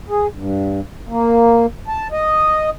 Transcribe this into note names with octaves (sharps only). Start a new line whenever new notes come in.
G#4
G2
A#3
A5
D#5